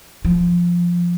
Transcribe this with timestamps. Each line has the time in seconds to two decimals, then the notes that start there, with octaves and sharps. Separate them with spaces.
0.25 F3